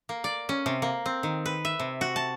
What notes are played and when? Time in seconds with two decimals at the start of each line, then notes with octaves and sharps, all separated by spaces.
0.09 A#3
0.24 D5
0.49 C#4
0.66 C3
0.82 A#3
1.06 C4
1.23 D#3
1.46 B4
1.65 E5
1.80 C3
2.01 F#4
2.16 A5